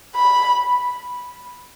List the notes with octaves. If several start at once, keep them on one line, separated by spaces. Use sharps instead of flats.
B5